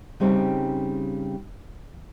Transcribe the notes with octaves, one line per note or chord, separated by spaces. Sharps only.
C#3 G3 C4 C#4 D#4